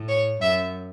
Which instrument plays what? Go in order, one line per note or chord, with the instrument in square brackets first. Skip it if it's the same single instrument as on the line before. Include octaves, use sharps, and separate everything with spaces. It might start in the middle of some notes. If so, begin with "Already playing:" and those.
Already playing: [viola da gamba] A2
[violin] C#5
[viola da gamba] F#2 [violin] E5